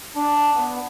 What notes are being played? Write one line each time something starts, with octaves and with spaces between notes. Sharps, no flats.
D4
B3